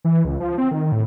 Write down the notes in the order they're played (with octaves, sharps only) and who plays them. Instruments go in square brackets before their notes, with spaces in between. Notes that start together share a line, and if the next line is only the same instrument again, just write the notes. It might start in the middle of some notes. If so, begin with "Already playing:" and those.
[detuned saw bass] E3
C#2
F3
C4
D#3
A2